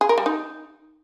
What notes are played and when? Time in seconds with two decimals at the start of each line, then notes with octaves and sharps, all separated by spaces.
0.01 G#4
0.09 A#4
0.18 G3
0.26 D#4